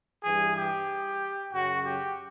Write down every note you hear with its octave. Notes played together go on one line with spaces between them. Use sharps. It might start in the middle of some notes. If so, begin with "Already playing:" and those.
G2 E3 G3 G#4
G4
F#2 C#3 F#3 F#4
G4